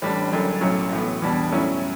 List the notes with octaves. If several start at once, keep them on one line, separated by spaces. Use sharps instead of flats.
A1 A2 G3 D4
F#1 F#2 D3
B1 A2 F#3 C#4
A2 E3 B3
E2 B2 G3 D4
A2 F#3 C#4 E4